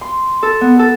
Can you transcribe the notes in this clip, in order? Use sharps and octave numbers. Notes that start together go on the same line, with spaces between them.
C6
A4
B3
A4